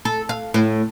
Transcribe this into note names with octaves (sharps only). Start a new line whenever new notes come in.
A4
F5
A2